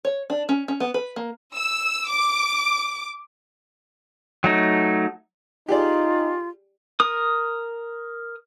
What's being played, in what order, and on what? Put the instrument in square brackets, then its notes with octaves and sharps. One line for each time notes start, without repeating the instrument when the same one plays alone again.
[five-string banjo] C#5
D4
C#4
C#4
B3
B4
A#3
[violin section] E6
D6
[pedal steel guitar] F#3 A3 D#4
[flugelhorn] D#4 [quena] F4 [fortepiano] G4 G#4 D5
[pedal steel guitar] A#4 D#6